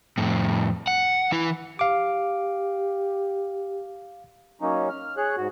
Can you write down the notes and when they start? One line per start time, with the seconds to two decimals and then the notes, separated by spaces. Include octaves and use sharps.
0.18 F2 A2
0.87 F#5
1.32 E3 E4
1.79 G4 F5 D6
4.61 F#3 A#3 C#4 D#4
4.89 F6
5.17 G#4 C#5 F#6
5.37 G#2 F#4